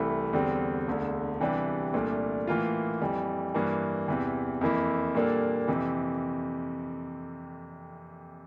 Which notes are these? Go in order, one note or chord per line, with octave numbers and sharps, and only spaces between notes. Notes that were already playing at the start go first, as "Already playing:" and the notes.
Already playing: C2 C3 E3 A3 E4
E2 D3 G3 C4
E1 D2 D3
C3 E3 G3 D4
C2 A#2 A3 D4
A2 E3 A#3 F4
F2 E3 G3
G2 E3 A#3
E2 C3 E3
F2 E3 A#3 E4
A#2 G3 A#3 D4 A4
F2 C3 E3